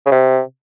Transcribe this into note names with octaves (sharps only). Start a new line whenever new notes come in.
C#3
C3